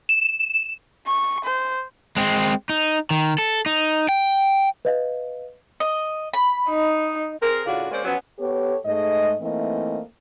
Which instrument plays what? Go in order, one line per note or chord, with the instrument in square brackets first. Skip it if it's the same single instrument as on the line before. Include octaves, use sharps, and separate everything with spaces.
[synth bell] E7
[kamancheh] C#6
C5
[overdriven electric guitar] G#3 C4
D#4
D#3
A4
D#4
G5
[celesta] B4 D#5 F5
[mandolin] D#5
B5
[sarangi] D#4
[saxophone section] C4 G#4 A#4
A2 C#3 D4 F4 F#4
G#3 A#3 C#4 C5 D5
F3 F#3 B3 C#4
[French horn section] B3 G4 A4 C#5
G#2 G#3 A3 D#5
E3 A3 A#3 C4 D#4 D#5